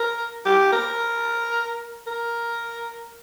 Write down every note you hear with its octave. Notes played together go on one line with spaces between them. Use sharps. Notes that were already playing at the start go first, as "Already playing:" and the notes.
Already playing: A#4
G4
A#4
A#4